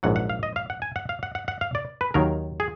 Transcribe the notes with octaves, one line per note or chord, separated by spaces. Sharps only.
A#1 G#2 F#3 F#5
F#5
F5
D#5
F5
F#5
G#5
F#5
F5
F#5
F#5
F#5
F5
D5
B4
D#2 D#3 F#3 A#4
G#4